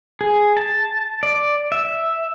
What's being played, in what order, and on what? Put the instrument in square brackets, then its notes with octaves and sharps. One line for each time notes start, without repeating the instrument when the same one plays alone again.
[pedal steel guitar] G#4
A5
D5
E5